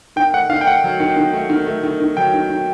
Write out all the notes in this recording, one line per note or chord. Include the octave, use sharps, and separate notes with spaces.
D#3 G5
A3 F#5
D#3 F5
G5
A3 F#5
F#3
D#3
D#3
A3
D#3
A3
D#3
D#3
F#3 G5
D#3
D#3